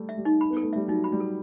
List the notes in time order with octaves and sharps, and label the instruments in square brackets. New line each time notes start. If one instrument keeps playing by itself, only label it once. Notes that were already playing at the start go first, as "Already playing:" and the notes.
Already playing: [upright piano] G3 A3
[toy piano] E5
[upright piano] G3
[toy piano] D#4
B5
[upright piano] B3
[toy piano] A4
[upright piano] A3
[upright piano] G3 [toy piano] E5
[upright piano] F#3 [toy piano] D#4
[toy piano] B5
[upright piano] G3
[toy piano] A4